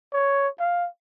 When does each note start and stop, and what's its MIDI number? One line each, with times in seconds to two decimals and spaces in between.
0.13 0.48 73
0.60 0.88 77